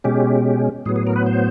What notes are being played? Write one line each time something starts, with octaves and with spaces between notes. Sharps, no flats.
B2 G#3 C#4 G4
A2 F#3 B3 G#4
G#4
A#4
B4
C5